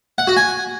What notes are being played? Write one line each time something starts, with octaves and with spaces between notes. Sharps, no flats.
F#5
F#4
G#5